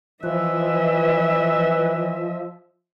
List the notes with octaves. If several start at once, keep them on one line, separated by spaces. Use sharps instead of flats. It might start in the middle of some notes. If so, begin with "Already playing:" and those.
E3 F3 B4 D#5 E5